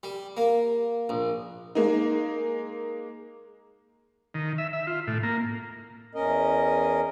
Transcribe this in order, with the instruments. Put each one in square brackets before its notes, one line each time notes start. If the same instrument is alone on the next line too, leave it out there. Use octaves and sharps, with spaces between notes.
[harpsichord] G3
A#3
A#1
[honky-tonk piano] G#3 A#3 D#4
[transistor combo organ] D#3
E5
E5
F4
A2
A#3
[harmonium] E2 C#4 A#4 D#5